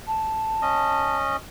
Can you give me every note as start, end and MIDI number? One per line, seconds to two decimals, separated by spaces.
0.07 1.17 81
0.62 1.37 61
0.62 1.37 75